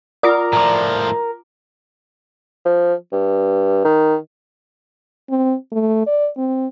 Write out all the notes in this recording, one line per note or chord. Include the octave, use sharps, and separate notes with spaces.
F4 A#4 D5 F#5 D#6
A2 F3 A#5 D6
F3
G2
D#3
C4
A3
D5
C4